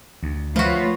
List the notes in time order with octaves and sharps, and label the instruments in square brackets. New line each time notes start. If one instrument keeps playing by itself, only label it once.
[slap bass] D2
[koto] F3 F#4 [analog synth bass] A3 [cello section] F4 B4 C#5